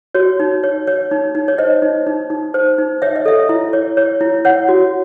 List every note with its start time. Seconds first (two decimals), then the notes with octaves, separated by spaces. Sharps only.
0.15 F#4 C#5
0.40 D#4
0.63 C#5
0.87 C#5
1.11 D#4
1.35 D#4
1.48 C#5
1.58 C5 D#5
1.82 D#4
2.07 D#4
2.30 D#4
2.54 C5
2.79 D#4
3.02 C#5 E5
3.16 D#5
3.26 A4 E5
3.49 E4
3.73 C#5
3.97 C#5
4.21 E4
4.45 C#5 F#5
4.69 F#4